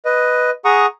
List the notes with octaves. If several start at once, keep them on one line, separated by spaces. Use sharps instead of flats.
B4 D#5
G#4 F#5 A#5 C#6 D#6